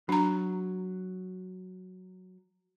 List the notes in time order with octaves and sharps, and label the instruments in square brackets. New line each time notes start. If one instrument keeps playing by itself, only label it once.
[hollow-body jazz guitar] F#3 [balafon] D4 A#5